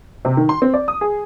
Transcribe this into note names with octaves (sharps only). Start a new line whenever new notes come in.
C3
D#3
C6
C4
D5
D#6
G#4